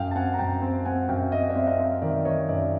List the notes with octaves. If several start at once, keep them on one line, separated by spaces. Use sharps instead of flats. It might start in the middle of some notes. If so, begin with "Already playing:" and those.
Already playing: F#2 F5 G5
A5
C4 F#5 G#5
A#5
F#2 G5 A5
C4
C4 F#5 G#5
F#2 F5 G5
E5
C4 D#5 F5
D5 E5
C4
D#5 F5
C4
D#5 F5
D#3 D5 E5
D#3 C#5 D#5
F#2 D5 E5